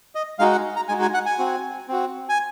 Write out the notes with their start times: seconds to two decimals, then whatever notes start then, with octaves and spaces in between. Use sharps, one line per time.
0.15 D#5
0.39 G#3 D#4 F#4 F5
0.52 F#5
0.76 A#5
0.89 G#3 D#4 F#4 G#5
1.02 G#5
1.14 F#5
1.26 G#5
1.39 C4 F#4
1.88 C4 F#4
2.29 G#5